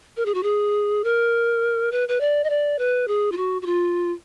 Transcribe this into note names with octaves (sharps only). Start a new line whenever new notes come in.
A#4
G#4
F#4
G#4
A#4
B4
B4
D5
D#5
D5
B4
G#4
F4
F#4
F#4
F4